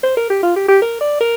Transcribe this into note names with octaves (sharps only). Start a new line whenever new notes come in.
C5
A#4
G4
F4
G4
G4
A#4
D5
A#4